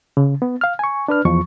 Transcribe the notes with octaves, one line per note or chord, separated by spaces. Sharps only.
C#3
B3
F5 F6
G#5 C#6
D4 B4 F6
E2 F3 C#6